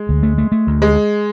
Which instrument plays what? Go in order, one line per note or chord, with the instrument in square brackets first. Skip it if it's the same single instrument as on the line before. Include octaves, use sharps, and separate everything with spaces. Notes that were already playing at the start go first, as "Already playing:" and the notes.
Already playing: [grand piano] G#3
[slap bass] D2
A3
A3
A3
D2
[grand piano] G#3